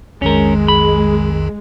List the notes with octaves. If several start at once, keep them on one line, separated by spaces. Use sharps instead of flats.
B1 F2 D#3 G#3 C#4 A#4
B5